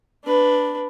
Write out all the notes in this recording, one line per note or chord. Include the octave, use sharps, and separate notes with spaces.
D4 B4